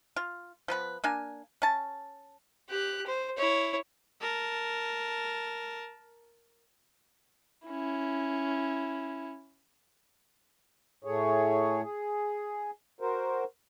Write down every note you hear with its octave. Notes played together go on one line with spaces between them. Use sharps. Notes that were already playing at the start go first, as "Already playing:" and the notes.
F4
F3 B3 B4
A#3 D4 G#5
C#4 A5
G4 F#6
C5
E4 C#5
A#4 A5
C#4 E4
A2 A3 G#4 C#5
G#4
F#4 A#4 C5